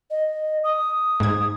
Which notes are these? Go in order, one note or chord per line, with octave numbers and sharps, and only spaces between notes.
D#5
D#6
G#2 G#6